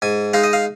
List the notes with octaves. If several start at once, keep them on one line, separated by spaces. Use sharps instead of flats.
G#2 G#5
G#3 D#4 F5
D#5
F5